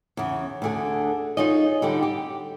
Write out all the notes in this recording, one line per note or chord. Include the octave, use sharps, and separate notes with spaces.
E2 C#3
D2 D3 G#4
D#4 F4 G#4 C#5 D#5
D3 G3 D#4 G4
G4